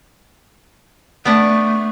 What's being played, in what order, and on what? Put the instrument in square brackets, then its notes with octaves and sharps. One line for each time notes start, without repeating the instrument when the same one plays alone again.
[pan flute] A3 [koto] B3 D4